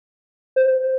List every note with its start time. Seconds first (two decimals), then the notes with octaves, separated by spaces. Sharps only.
0.56 C5